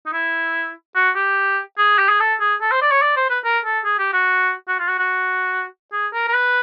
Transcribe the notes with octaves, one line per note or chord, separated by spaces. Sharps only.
D#4
E4
F#4
G4
G#4
G4
G#4
A4
G#4
A4
C5
D5
C#5
D5
C5
B4
A#4
A4
G#4
G4
F#4
F#4
F4
F#4
F#4
G#4
A#4
A#4
B4